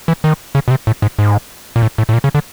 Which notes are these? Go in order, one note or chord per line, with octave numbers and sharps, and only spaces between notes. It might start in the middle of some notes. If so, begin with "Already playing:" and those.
E3
D#3
C#3
B2
C3
A2
G#2
G#2
A#2
A2
A2
A2
A#2
C#3
D3